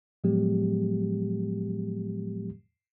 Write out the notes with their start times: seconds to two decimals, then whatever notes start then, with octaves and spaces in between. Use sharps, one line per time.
0.24 A2 F3 F#3 G#3 B3 G4